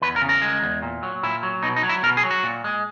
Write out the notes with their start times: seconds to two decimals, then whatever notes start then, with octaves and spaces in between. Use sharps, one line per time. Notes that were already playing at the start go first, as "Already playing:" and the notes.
0.02 E2 B4
0.16 A#4
0.22 C#3
0.29 A#4
0.42 G#3
0.62 E2
0.82 A#2
1.03 F#3
1.23 A#2 E4
1.43 F#3
1.62 B2 D#4
1.76 D#4
1.83 F#3
1.89 E4
2.03 B2 A#4
2.17 G#4
2.23 F#3
2.31 F#4
2.43 A#2
2.64 G#3